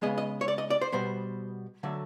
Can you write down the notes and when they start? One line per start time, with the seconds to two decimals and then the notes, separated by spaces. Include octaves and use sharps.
0.02 C#3 F3 G#3 B3 D#5
0.18 D#5
0.41 C#5
0.48 D5
0.58 D#5
0.70 D5
0.81 C5
0.92 B2 G3 B3 C5
1.83 D3 F#3 A3